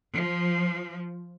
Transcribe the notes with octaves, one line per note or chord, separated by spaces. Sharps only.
F3